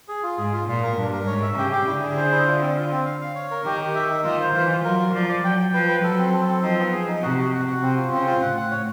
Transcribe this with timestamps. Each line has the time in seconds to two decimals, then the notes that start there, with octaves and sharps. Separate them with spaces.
0.08 G#4
0.23 F4
0.38 G#2 G#4
0.53 F4
0.67 A#2 F4
0.83 A#4
0.98 G2 D4
1.12 A#4
1.27 G#2 C#5
1.42 E5
1.57 C#3 G4
1.72 G4
1.87 D3 E4
2.02 G#4
2.17 C5
2.32 E4
2.47 F4
2.61 C4
2.76 F4
2.91 C4
3.06 F5
3.21 F5
3.35 C#5
3.51 A#4
3.65 D#3 G4
3.80 G4
3.95 E5
4.10 D#4
4.25 D#3 F4
4.40 C5
4.55 E3 F4
4.70 F4
4.84 F#3 A#4
5.00 A#4
5.14 F3 D5
5.29 D5
5.44 F#3 G5
5.59 G5
5.74 F3 B4
5.88 B4
6.03 F#3 A4
6.18 C4
6.33 A4
6.48 C4
6.62 F3 D#4
6.78 B3
6.93 G#4
7.08 D#4
7.22 C3 F#4
7.37 F#4
7.52 F#4
7.67 F#4
7.82 C3 C4
7.96 F4
8.12 C#3 C4
8.27 F4
8.41 A2 F#5
8.57 F#5
8.71 C#5